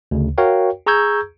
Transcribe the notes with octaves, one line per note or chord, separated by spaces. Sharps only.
D2 C#3
F#4 A#4 C#5 F5 G5
G#4 A#5 C#6 E6 G6 G#6